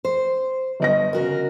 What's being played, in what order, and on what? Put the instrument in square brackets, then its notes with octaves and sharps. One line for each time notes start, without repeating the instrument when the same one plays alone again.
[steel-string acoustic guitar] C5
[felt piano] G1 D#5 A#6
[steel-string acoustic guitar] C#3 F#4 A#4